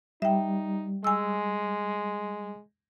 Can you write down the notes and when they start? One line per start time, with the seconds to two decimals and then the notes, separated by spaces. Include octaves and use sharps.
0.22 G3 D#4 E5 G5
1.04 G#3 G#5 E6